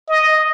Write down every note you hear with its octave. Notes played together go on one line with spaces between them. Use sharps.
D#5